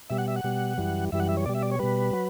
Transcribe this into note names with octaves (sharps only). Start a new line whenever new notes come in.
B2 G3 E5
F#5
E5
F#5
B2 G3
F#2 E3 G3
F#2 E3 G3 E5
F#5
E5
C#5
B2 G3 D5
E5
D5
C#5
B2 G3 B4
F#3